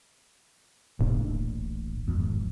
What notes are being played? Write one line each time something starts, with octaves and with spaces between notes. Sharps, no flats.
D1 A1 A#2 D4
G#1 F2